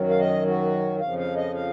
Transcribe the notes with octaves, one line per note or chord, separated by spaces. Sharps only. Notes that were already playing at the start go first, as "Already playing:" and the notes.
Already playing: F#2 D#3 F#3
F5
D#5
F#4
F2 C#3 F3 F5
F5
D#5
F5